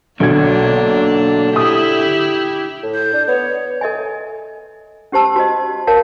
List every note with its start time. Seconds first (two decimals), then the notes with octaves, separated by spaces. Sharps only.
0.20 B1 D3 A#3 D4 G#6
1.56 E4 G4 D#6
2.83 A2
2.94 G6
3.13 D4
3.27 B3 C#5
3.81 A4 D#5 E5 G#5
5.12 C#4 G4 C5 A5 E6
5.36 F#4 C5 D#5
5.87 A#4 C#5 F5 A5